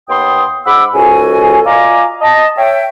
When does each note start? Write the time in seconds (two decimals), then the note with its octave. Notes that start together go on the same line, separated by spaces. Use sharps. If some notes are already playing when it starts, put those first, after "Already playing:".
0.09 D#2 B3 G5 C6 D#6
0.66 G#2 F#5 B5 D6 E6
0.94 C#2 G#2 F#4 A4 G#5
1.65 F4 D5 D#5 G#5 A#5 D6
2.21 D#5 A5
2.56 C#5 E5 G5